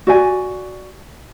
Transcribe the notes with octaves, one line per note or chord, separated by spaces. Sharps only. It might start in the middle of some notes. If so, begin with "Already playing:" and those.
F#4 D5 G#5